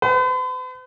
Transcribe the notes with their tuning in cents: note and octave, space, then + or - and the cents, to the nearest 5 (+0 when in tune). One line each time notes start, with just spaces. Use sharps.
B4 +45